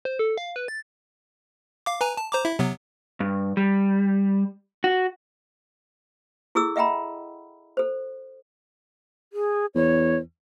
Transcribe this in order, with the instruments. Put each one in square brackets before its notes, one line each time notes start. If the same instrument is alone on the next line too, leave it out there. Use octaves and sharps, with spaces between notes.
[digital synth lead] C5
A4
F5
B4
A6
[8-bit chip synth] F5 D6
B4 G#5 A#5
A5
C5 A#5 D6
E4 E5
C3 F#3 B3
[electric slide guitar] G2
G3
F#4
[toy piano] E4 G#4 A4 D6 E6
D#5 E5 F#5 G5 A#5 B5
A4 C5
[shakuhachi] G#4
[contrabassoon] E2 [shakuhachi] C#5